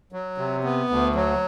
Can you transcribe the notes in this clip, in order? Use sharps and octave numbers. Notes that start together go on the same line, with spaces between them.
F#3
C3
B3
D2
F#3